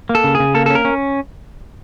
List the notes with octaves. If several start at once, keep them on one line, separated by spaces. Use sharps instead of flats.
A#3
A4
C#3
C#3 G#4
A#3 A4
A4
C#4
A#4
C#4